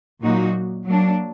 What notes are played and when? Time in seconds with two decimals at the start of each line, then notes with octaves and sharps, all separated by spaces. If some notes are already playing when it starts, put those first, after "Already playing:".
0.22 A#2 F#3 A#3 D#4 F#4
0.87 F#3 A#3 D4